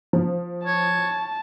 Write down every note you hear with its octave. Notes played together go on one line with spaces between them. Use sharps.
F3
C#5 A5